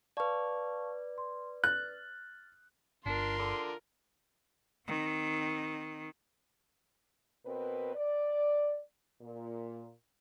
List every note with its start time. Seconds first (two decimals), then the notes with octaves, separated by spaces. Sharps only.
0.17 B4 D5 F5 A5 C#6
1.18 C6
1.64 F6 F#6 A6
3.06 G1 D4 F4 A#4 C6
3.39 D3
4.87 D#3 C4
7.46 B2 C4 A#4 B4
7.95 D5
9.22 A#2